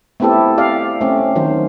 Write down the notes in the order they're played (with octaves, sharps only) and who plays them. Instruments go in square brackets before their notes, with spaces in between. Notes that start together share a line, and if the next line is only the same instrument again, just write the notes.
[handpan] A3 B3 C4 E4 G4 A4
G4 D5 F5
A3 C4 C#4
D#3 F#3 C5